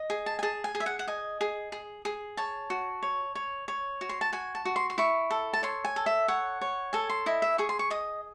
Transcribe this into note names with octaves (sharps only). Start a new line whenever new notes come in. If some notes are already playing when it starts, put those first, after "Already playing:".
Already playing: D#5
G#4
A5
G#5
G#4 A5
G#5
G#4
E5
F#5
F#5
D#5 G#5
G#4
G#4
G#4
C#5 A5
F#4
C#5
C#5
C#5
F#4
C6
A5
F#4 G#5
A5
F#4
C6
C6
E4 C#6
A4
A5
C#5 C6
G#5
A4
E5
C#5 F#5
C#5
A4 G#5
C6
E4 D#5
E5
G#4 C#6
C6
C#6
D#5 D#6